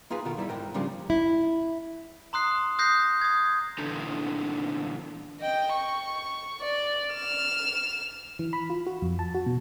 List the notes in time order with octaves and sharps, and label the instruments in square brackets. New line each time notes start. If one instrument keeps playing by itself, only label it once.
[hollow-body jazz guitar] A#3 F4 G#4 B4 F5 G#5
B2 D#3 F4 A4 A#4
G2 G3 E4 E5
G#2 A#4 G5
C#3 F3 G3 A#3 C#4 D4
[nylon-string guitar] E4
[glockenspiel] A#5 C6 D#6 F#6 C7
D#6 F#6 G6 A#6 C7
D#6 G#6
[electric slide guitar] A#2 D3 E3 D4 A4 A#5
[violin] D#5 G5
C#6
D5
F6 E7
[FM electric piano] E3
B5
F4
F#4
F2
A5
F#4
B2